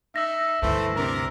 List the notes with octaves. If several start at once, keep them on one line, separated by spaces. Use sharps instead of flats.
D#4 E5 E6 A#6
D2 G2 E3 A3 C5
C3 D4 A#4